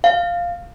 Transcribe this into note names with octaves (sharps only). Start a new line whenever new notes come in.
F5